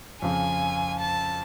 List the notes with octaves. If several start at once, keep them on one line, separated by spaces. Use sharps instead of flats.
F2 C#3 F3 G#5
A5